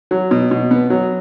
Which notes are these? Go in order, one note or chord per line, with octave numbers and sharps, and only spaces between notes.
F#3
B2
B2
B3
F#3